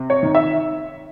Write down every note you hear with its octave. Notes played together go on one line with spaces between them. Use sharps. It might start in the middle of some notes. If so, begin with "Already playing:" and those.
Already playing: C3
C#5
D#3
E5